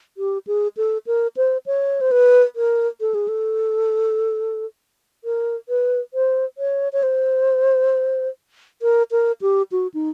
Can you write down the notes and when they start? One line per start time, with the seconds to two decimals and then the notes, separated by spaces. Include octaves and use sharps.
0.17 G4
0.47 G#4
0.77 A4
1.07 A#4
1.37 C5
1.66 C#5
2.01 C5
2.11 B4
2.56 A#4
3.01 A4
3.14 G#4
3.28 A4
5.24 A#4
5.69 B4
6.14 C5
6.58 C#5
6.93 C#5
7.03 C5
8.82 A#4
9.11 A#4
9.42 G4
9.72 F#4
9.94 D#4